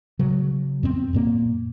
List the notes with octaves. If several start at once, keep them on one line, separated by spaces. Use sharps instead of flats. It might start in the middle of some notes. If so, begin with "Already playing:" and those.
C#3 F#3
F#2 B3 C4
F#2 A#2 A#3